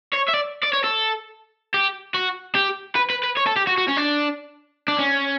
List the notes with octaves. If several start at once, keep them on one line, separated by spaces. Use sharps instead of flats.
C#5
E5
D5
D5
C#5
A4
G4
F#4
G4
B4
B4
B4
C#5
A4
G4
F#4
F#4
C#4
D4
D4
C#4